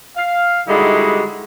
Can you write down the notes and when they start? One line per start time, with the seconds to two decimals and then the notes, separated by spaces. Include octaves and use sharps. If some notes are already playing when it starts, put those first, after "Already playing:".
0.16 F5
0.68 D3 G3 G#3 D#4 E4 F#4